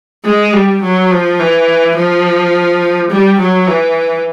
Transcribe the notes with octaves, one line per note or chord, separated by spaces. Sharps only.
G#3
G3
F#3
F3
E3
F3
G3
F#3
E3